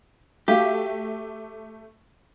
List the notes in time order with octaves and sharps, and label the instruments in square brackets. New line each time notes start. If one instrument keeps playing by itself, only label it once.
[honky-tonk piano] A3 [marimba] F#4 F5 [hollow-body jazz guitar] G4